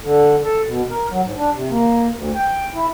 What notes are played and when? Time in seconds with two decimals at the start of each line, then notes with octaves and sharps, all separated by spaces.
0.02 D3
0.43 A4
0.67 B2
0.90 A#4
1.10 F#3
1.24 G#2
1.36 D4
1.55 C3
1.70 A#3
2.15 D2
2.35 G5
2.75 E4